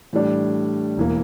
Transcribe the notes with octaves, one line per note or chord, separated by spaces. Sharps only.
A2 E3 G3 D4
E1 E3 A#3